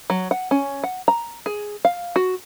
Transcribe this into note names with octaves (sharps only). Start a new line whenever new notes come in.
F#3
F#5
C#4
F#5
A#5
G#4
F5
F#4